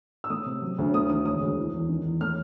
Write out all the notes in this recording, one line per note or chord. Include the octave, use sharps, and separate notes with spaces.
E6
A3 D#6
C3
F#3
D2
A3 D#6
D#3 D#6
E1 D#6
D2
E3
E2
D#3
E2
A3 F6